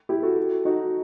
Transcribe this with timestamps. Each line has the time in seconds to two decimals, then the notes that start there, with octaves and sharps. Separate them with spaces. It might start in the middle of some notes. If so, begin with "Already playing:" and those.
0.09 E4 G4
0.22 F#4 A4
0.65 D#4 F#4